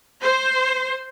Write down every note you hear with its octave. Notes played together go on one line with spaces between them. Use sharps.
C5